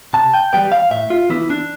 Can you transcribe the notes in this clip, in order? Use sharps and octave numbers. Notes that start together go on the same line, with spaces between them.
C3 A5
G5
E3 G3 B3 G5
F5
A2 E5
F4
E3 B3 E4
D4